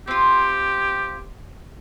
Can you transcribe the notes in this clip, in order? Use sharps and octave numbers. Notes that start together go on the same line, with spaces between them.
C4 F4 G4